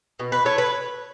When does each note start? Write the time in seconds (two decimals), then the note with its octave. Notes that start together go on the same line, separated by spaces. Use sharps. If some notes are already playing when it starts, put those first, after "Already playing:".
0.20 B2
0.32 B4
0.45 A3 C#5
0.58 B4